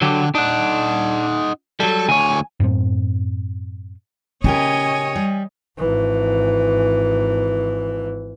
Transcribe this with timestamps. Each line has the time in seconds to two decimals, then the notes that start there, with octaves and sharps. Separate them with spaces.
0.02 D3 F#3 G4
0.35 D4 D#4 F#5
1.80 F#3 G3 A4
2.09 D2 C#5 G#5
2.60 F#2 A2 A3 C4
4.44 C#3 C#4 G4 A#4 C#5 D#5 G#5
5.15 G3
5.78 G#1 E3